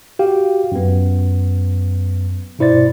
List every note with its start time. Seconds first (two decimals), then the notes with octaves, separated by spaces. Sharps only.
0.19 F#4 G4 F5 G5
0.72 F#2 B3
2.59 G2 B2 E4 C5 D5 A6